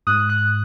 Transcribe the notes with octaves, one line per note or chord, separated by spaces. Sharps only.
G#2 D#6 F#6
D#6 F#6